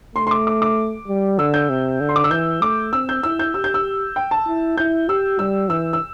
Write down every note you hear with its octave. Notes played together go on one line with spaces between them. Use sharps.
A3 C6
C6
D6
D6
D6
G3
D3 E6
G6
C3
D3
C6
D6
E6
E3 G6
A3 D6
C4 E6
G6
E4 E6
G6
G4 E6
G6
E6
G5
A5
E4
E4 G6
G4 E6
G3 E6
E3 E6
E6